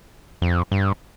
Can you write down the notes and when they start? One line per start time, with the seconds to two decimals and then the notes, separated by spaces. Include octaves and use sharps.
0.42 F2
0.72 G2